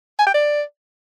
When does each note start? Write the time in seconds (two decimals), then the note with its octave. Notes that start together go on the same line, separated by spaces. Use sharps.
0.19 G#5
0.26 G5
0.34 D5